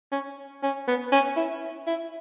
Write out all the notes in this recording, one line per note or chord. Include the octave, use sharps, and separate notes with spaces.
C#4
C#4
B3
C#4
E4
E4